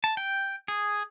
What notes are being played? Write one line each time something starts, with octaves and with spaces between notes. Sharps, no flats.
A5
G5
G#4